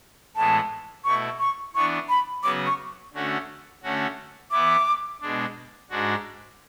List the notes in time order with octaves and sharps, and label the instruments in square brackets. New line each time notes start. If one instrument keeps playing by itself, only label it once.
[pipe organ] A2 E3 G#3 B3 [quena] A5
[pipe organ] B2 A3 E4 [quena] C#6
[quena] C#6
[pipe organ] E3 B3 D4 [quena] C#6
[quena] B5
[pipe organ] C#3 F#3 B3 F#4 [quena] D6
[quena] C#6
[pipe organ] D3 A3 C#4 F#4
D3 A3 C#4 F#4
[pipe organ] E3 B3 E4 [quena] D6
[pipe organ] B2 G#3 D4
G#2 G#3 D4 F#4